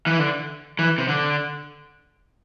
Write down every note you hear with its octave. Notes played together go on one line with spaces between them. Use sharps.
E3
D3
E3
C3
D3